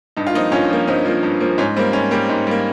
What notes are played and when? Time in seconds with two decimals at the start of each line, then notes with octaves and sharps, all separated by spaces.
0.16 G2 D#4
0.27 F4
0.34 F3 A#3 C4 D#4
0.52 G2 C#4 F4
0.70 F3 A#3
0.87 G2 C4 D#4
1.05 F3 A#3
1.23 G2
1.40 F3 A#3
1.58 G#2 C#4
1.77 G3 A#3 C4
1.93 G#2 C#4
2.11 G3 A#3
2.29 G#2
2.47 G3 A#3